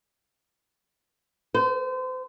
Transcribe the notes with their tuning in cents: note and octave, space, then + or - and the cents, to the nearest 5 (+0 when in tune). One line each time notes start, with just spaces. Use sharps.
C5 -35